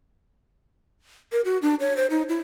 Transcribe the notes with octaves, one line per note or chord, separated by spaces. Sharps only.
A#4
F#4
D4
C#5
C5
D#4
E4